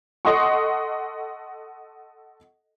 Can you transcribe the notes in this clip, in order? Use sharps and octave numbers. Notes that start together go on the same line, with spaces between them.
A4 D#5 F#5 C6 C#6